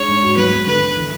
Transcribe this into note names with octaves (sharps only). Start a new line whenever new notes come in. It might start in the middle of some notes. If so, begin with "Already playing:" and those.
Already playing: G#3 D4 C#5
G#2
F#4
F#3 B4
B3
D3 B4
D3
E3